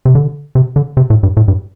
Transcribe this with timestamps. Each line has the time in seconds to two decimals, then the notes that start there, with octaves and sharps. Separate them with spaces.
0.05 C3
0.15 D3
0.55 C3
0.76 D3
0.97 C3
1.10 A2
1.23 G2
1.37 A2
1.48 G2